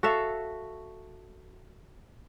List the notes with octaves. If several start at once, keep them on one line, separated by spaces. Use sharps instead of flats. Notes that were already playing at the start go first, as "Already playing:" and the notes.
F#4 A4 E5 F5